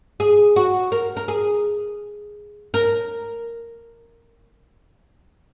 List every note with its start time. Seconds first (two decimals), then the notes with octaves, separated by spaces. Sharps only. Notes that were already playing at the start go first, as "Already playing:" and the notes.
0.20 G#4
0.56 F#4
0.92 A#4
1.17 A#4
1.28 G#4
2.74 A#4